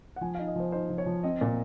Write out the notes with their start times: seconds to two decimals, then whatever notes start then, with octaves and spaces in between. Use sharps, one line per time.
0.16 F#5
0.21 F3 G#5
0.35 D#4 F5
0.47 D#5
0.55 F3 C5
0.72 D#4 C5
0.90 F3
0.98 C#5
1.06 F3
1.23 C4 D#5
1.41 A#2